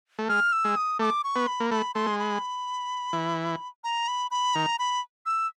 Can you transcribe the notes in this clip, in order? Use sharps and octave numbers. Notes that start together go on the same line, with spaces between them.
A3
G#3 F6
E6
G#3
D#6
A3 D6
C#6
B3
B5
A#3
A3 B5
A3 C6
G#3
B5
E3
A#5
B5
B5
D#3 A#5
B5
E6